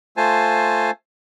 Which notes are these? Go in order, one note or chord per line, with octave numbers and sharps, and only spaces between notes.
A3 F4 C5 G#5 A5